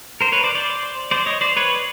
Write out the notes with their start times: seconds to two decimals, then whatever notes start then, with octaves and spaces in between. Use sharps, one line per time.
0.21 A#4 C5
0.32 B4 C#5
0.44 C5 D5
0.55 C5 D5
1.11 C5 D5
1.26 C#5 D#5
1.41 C5 D5
1.57 B4 C#5